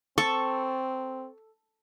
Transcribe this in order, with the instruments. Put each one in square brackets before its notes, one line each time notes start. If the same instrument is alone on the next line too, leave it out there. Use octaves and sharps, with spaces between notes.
[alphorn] C4 [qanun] A4 [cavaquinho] C#6